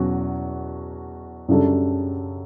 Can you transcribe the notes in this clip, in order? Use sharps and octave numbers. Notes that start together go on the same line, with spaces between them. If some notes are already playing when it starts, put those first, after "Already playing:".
Already playing: E2 B2 F#3 C#4 F#4
F#2 C#3 G3 D4 A4